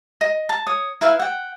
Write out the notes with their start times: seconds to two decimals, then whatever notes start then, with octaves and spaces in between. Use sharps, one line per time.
0.21 D#5
0.49 A5
0.67 C#5 D#6
1.01 E4 B4 E5 F5
1.19 F#5 G5